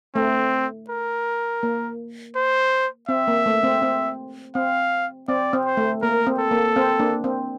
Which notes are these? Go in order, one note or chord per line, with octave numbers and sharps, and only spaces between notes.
A3 C4
A#4
A#3
C5
C4 E5
A#3
A3
C4
C4
C4 F5
C4 D5
C4
C5
A3
A#3 A#4
C4
A4
A#3
C4
A#3 D4
C4